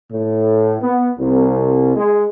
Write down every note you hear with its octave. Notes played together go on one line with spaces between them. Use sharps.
A2
B3
C2
G#3